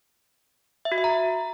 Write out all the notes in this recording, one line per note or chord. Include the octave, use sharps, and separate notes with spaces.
E5
F#4
E5
A#5